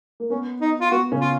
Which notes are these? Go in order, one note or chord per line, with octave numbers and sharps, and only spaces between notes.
A#3
B3 C#4
D#4
F4
B3 F#4
C#3 C#4
F4